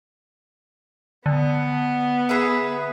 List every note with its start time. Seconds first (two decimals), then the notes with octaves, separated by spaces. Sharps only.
1.26 D3 B3
2.29 G#4 B4 E5